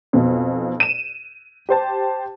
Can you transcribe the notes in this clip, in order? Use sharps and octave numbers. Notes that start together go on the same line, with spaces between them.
B1 F2 B2
D#7 E7
G4 C5 A5